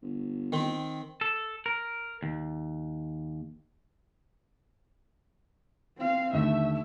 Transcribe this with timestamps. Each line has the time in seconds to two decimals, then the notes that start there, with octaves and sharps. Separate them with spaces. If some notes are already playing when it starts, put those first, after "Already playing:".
0.03 G1
0.52 D#3 C4
1.21 A4
1.66 A#4
2.23 D#2
5.98 C4 F5
6.33 D#2 D3 A3 E5